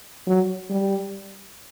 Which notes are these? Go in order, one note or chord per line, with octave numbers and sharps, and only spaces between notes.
F#3
G3